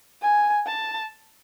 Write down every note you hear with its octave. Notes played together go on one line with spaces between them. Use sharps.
G#5
A5